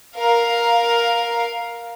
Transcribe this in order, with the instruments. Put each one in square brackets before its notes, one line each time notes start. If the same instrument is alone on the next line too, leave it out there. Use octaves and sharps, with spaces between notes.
[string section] A#4 F5